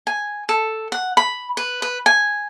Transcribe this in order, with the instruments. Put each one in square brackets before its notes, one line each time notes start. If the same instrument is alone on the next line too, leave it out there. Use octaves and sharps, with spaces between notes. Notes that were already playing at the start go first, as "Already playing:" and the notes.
[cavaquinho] G#5
A4
F#5
B5
B4
B4
G#5